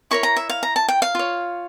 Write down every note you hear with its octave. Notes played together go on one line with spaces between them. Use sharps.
E4 A#4 C#5 C#6
A#5
E5
F5
A#5
A5
G5
F5
F4 C#5